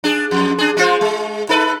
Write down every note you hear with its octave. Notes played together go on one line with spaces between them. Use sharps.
D4 G#4
F2
D4 G#4
G#3 F4 C5
G#3
D#4 A4 B4